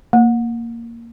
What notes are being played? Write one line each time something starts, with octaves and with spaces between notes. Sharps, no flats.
A#3